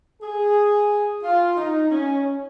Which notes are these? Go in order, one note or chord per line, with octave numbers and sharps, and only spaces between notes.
G#4
F4
D#4
C#4